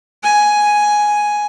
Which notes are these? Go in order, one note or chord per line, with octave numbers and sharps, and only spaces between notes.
G#5